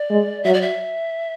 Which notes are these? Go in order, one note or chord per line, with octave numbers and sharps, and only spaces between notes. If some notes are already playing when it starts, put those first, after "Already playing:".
Already playing: D5
G#3
F#3 E5
D5
E5